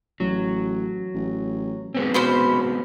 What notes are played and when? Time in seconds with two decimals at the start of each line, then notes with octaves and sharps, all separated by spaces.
0.20 A1 F#3
1.14 A1
1.95 G#3 B3 C4
2.14 B2 C#4 C5 B5